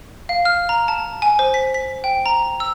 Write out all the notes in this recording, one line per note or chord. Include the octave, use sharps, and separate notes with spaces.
F5
F6
A#5
A5
G#5
C5
B6
B6
G5
A#5
E6